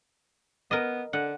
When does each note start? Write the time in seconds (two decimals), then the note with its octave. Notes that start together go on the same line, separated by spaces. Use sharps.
0.71 B3 A#4 D#5
1.13 D3 F#5